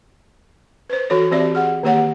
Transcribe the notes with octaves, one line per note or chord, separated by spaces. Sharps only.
B4 C5
E3 F#4 A4 C#5
E3 C4 G4 D5 E5
G#4 F#5
D#3 A#3 G4 C#5 F#5